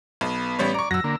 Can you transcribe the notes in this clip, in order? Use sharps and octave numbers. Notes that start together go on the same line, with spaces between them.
B1 B3
A1 G3 C#5
D5 A#5 C#6
F#2 F#3 E6 A#6
D3 A#3